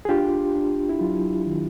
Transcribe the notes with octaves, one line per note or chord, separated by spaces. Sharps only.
G#4
D4 F4 G4
D4
E4
F#3 F4
D#3